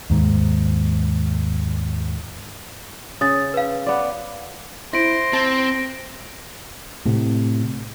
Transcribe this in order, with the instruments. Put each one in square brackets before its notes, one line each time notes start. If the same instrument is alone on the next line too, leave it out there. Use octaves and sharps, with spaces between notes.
[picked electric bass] D#2 G#2
[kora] C#3 [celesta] D#6 A6
[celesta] B4 F5
[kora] B3 D5
[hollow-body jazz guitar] E4 [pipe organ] C5 [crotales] A#6 D7
[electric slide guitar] C4 [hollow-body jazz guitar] A5
[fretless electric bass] A2 C3